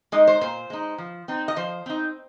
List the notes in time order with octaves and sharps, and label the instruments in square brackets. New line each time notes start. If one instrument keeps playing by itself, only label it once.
[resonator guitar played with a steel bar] G#3 D#4 D#5
C5
A#2 C5
G#3 D#4
F3
C4 D#4
D#5
F3 C5
C4 D#4